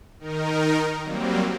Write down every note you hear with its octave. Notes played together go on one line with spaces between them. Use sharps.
D#3 D#4 A#4
F#3 G3 A#3 C4